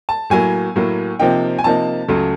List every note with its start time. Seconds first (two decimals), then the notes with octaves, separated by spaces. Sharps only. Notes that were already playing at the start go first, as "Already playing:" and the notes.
0.09 A5
0.30 A2 F#3 A#3 G#5
0.76 A2 F#3 A#3
1.19 C3 F3 A#3 D#4 G5
1.59 G#5
1.64 C3 F3 A#3 D#4 A5
2.08 C#2 C#3 F#3 A3